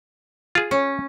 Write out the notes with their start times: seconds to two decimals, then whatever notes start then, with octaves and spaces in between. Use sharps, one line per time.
0.55 F4 G#4
0.71 C#4